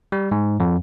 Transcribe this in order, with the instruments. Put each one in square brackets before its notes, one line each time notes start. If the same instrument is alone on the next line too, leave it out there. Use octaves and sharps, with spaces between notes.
[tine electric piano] G3
G#2
F2